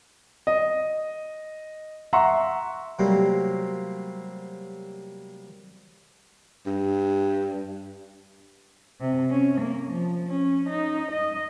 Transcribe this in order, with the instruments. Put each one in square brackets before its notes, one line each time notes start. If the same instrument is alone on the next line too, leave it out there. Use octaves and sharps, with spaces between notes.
[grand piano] D#5
E5 F#5 A#5 C6 C#6
[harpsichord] C3 F#3 G3 A3 A#3 C4
[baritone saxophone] G2
[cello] C3
C#4
A#3
F3
C#4
D#4
D#5